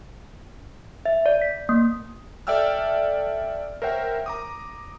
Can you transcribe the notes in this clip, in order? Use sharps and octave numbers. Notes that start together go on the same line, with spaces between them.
E5
D5
B6
A#3
A4 D5 E5 G5 E6 F6
A#4 C5 C#5 E5 F#5 G5
A#5 D6 D#6